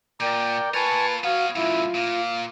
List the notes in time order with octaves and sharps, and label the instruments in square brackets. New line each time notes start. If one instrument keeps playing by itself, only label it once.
[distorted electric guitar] A#2 [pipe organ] A#4 D5 G5
[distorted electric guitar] F4 A#4 [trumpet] B4 [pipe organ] G#5 A5 C#6
[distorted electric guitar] B3 C#5 [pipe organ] F#4 [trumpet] F5
[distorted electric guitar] F#2 A2 [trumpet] E4 [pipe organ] F4
[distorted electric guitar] A#2 [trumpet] F5